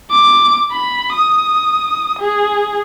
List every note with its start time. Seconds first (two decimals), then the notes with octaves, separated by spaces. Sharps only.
0.11 D6
0.71 B5
1.14 D#6
2.19 G#4